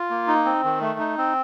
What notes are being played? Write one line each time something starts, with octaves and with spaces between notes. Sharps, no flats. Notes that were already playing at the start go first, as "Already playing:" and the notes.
Already playing: F4
A#3
D#4
C4
D#3
A3
D#4
C4